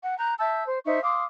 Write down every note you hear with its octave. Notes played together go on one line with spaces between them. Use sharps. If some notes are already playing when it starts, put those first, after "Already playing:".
F#5
A#5 F#6 G6
E5 A5 E6 G6
C5
D#4 C5 E5 C#6
F5 C6 D6 D#6